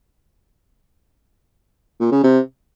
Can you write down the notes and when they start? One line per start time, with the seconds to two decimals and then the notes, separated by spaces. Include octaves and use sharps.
2.00 A#2
2.12 C#3
2.24 C3